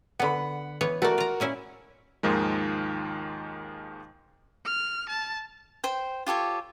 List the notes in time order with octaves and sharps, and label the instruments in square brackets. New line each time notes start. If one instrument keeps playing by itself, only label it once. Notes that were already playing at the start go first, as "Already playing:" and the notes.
[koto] D3 B3 [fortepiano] F#5 B5
[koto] E3 B3 C#5
[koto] A3 D5 [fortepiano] F#4 A#4
[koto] F4 A#5
A#2 C#4 E4
[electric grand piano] D#2 G#2 D#3 F3 G#3
[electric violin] F6
A5
[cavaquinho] C5 G5
F4 G4 A4 C#5